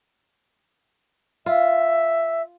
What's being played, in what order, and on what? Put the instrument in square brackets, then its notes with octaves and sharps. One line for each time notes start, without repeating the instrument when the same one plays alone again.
[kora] F4 [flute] E5